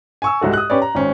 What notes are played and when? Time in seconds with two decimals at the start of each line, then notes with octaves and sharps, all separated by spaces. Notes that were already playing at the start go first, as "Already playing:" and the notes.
0.22 G#5 C#6 E6
0.41 C2 G#2 F#4 A4
0.53 D#6 F#6
0.70 C#4 G4 B4 C#5 D5
0.82 A#5
0.95 G#1 C#4 C5